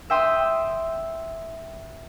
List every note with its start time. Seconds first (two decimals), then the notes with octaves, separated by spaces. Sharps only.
0.10 E5 G5 C6 D#6